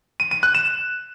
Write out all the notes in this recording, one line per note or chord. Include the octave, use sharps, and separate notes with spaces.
D#7
D#7
F#6
E7